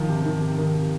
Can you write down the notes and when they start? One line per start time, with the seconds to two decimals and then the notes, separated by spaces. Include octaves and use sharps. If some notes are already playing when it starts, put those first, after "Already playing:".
Already playing: D#3 F3
0.09 C3
0.21 C3
0.25 D#3
0.41 C3
0.58 D#3
0.74 C3